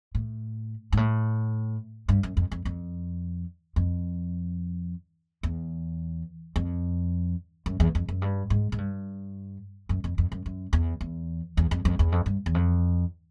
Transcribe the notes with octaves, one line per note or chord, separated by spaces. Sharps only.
A2
G#2
A2
G2
F#2
F2
F2
F2
F2
E2
F2
F#2
E2
F2
F#2
G2
G#2
G#2
G2
F#2
F2
F2
F#2
F#2
E2
E2
E2
F2
F2
E2
F2
G2
E2
F2